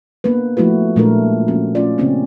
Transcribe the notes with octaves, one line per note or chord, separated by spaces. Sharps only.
A#3 B3 D4 B4
F3 A3 E4 F#4 B4
A#2 G#3 A3 D4 A4 A#4
F3 A#3 C#4 F#4
A3 C#4 F4 D5
C#3 A#3 C4 C#4 D#4